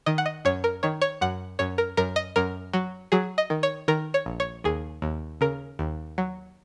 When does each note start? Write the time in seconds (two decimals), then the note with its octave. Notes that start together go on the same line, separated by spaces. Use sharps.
0.06 D#3 D#5
0.18 F#5
0.26 D#5
0.45 F#2 C#5
0.64 A#4
0.83 D#3 C#5
1.02 C#5
1.21 F#2 F#5
1.59 F#2 C#5
1.78 A#4
1.97 F#2 A#4
2.16 D#5
2.36 F#2 A#4
2.73 F#3
3.12 F#3 G#4
3.38 D#5
3.50 D#3
3.63 C#5
3.88 D#3 A#4
4.14 C#5
4.26 A#1
4.40 C#5
4.64 D#2 G#4
5.02 D#2
5.41 C#3 A#4
5.79 D#2
6.18 F#3